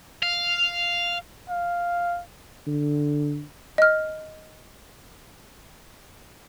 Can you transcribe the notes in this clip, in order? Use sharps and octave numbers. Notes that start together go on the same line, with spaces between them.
F5
F5
D3
D#5 F6